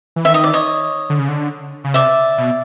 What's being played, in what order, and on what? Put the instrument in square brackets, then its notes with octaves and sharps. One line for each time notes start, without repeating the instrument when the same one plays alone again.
[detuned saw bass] E3
[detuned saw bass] D#3 [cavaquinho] E5
[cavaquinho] D#5
D5
C#5 D#5
[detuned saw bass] D3
C#3
D3
C#3
[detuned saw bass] C3 [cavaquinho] D5 E5
[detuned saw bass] B2